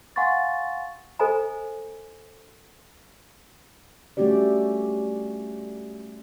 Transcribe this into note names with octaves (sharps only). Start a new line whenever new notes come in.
F5 F#5 G#5 C6 C#6 A6
A4 C5 D#5 G#5 A#5
G3 A3 C#4 F#4 G4 D5